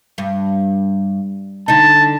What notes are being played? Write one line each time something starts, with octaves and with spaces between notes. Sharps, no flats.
G2
D3 D#4 A5